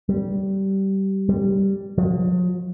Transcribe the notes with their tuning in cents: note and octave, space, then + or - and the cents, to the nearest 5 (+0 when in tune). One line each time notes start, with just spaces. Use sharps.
G3 -20
G3 -5
F3 +45